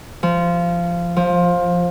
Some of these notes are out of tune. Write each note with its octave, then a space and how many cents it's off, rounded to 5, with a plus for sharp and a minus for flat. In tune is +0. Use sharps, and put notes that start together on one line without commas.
F3 -15
F3 +15